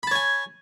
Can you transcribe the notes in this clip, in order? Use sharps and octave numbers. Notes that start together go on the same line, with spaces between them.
C#5 G#5 A5 B5